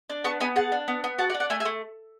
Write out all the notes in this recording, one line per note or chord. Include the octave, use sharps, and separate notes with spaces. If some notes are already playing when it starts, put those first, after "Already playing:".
D4
B3 A5 C#6
B3 G#5 B5
G#4 F#5 A5
D4
B3
B3
F#4 F#5 A5
D5 F#5
D4
D5 F#5
A3 E5 G#5
E5 G#5
A3